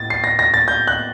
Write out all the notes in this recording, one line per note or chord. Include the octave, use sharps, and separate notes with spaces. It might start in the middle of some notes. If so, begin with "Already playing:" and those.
Already playing: A2 A6
C7
A#6
A#6
A6
G6
F#6